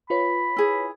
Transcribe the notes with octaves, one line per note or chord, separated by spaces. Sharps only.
F4 B4 C#5 B5
E4 G#4